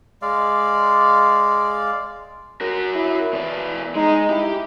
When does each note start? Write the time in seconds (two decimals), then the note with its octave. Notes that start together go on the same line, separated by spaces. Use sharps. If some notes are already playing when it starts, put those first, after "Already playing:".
0.22 G#3 D5 F5
2.61 F#4 A#4
2.95 E4
3.33 B2 E3 D5
3.95 G#3 D#4
4.30 E4 G4